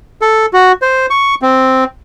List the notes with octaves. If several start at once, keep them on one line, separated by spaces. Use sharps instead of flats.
A4
F#4
C5
C#6
C4